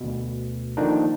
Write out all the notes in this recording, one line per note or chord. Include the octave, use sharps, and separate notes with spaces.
D2 B2
D3 D#3 F3 A#3 D4 D#4